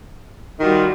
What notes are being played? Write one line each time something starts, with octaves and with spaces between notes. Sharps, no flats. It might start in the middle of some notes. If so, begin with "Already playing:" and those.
D#3 G3 F4 F#4